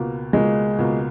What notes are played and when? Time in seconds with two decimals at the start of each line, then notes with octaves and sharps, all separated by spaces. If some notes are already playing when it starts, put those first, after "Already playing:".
Already playing: C#2 B2 A#3
0.33 C#2 B2 G#3 A#3
0.79 C#2 B2 A#3